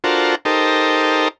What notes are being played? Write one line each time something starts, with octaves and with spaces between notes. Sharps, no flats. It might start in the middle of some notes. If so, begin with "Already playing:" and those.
D4 F4 F#4 A4 A#4 C5
D#4 G4 A4 A#4 C5